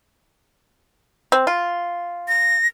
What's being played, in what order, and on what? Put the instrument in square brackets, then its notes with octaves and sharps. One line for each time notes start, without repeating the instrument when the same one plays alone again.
[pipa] C4
F4
[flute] A#6